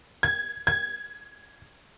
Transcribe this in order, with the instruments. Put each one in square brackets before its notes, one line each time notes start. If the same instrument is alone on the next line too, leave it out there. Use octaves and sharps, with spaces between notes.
[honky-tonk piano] G#6
G#6